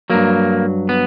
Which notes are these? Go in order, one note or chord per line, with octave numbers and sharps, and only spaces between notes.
G2 F#3 A#3
B3